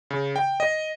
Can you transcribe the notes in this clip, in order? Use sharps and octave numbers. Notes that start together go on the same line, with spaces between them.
C#3
G5
D#5